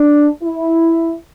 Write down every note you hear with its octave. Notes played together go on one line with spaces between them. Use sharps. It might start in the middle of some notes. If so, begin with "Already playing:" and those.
Already playing: D4
E4